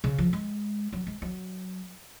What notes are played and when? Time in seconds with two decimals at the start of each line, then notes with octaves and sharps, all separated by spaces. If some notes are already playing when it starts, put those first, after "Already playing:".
0.04 C#3
0.18 F3
0.33 G#3
0.93 F#3
1.07 G#3
1.22 F#3